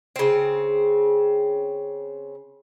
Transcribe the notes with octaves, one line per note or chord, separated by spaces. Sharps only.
C#3 C4